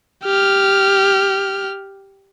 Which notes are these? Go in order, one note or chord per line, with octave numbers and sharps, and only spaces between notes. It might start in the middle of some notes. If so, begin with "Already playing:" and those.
G4 F6